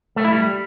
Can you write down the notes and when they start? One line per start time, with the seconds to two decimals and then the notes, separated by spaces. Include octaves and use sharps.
0.16 A3
0.25 E4
0.33 G3